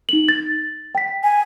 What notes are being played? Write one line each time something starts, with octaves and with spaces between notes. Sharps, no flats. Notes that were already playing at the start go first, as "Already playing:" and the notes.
D#4 F#7
A6
G5 B6
G#5